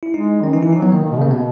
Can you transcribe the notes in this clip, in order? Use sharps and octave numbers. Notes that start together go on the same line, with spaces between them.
E4
G#3 D#4
D#3 C#4
E3 D#4
E4
E3
D#4
F#3 B3
D#3 A#3
D#3
B2
C#3 A#3
B2 B3